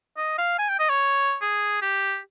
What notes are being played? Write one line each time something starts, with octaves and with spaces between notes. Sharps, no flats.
D#5
F5
G#5
G5
D#5
C#5
G#4
G4